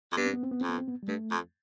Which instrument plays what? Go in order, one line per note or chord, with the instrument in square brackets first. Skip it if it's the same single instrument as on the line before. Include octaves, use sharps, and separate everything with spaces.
[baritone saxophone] F2
[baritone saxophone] G2 [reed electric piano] B3
[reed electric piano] C4
B3
C4
B3
[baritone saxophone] F2 [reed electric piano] C4
[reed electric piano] B3
C4
B3
G3
[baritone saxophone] G2 [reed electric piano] A3
[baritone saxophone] F2